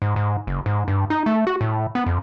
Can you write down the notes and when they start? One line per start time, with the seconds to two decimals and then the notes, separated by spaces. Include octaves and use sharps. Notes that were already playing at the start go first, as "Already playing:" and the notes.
0.02 G#2
0.16 G#2
0.47 F#1
0.66 G#2
0.88 G2
1.10 D#4
1.26 A3
1.47 F#4
1.61 A2
1.95 B3
2.06 F2